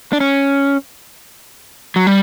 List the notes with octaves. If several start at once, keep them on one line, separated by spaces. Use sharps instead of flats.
D4
C#4
F#3
G3